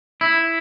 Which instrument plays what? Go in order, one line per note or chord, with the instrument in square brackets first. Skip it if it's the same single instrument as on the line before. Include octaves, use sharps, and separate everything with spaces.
[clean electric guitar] E4